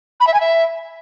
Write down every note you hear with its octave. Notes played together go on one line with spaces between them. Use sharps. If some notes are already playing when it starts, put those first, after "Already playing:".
B5
E5
G#5
E5